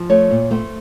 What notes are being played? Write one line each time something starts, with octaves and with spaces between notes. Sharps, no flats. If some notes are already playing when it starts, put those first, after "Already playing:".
Already playing: F3
A3 C#5
A#2
A3 C5